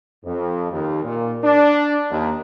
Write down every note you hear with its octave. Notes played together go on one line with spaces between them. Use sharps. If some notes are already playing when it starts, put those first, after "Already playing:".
F2
D#2
A#2
D4
D#2